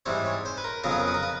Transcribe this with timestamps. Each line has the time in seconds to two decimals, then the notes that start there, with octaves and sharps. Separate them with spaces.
0.06 G#2 E3 G3 C4 C#5
0.26 C#5
0.45 C5
0.58 B4
0.64 A#4
0.84 F2 C#3 F#3 B3 A#4
0.91 B4
0.99 A#4
1.08 B4
1.14 A#4
1.23 B4